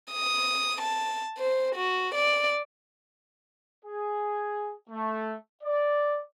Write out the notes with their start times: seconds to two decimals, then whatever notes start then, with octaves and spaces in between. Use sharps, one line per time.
0.12 D#6
0.82 A5
1.38 C5
1.75 F#4
2.15 D5
3.85 G#4
4.90 A3
5.63 D5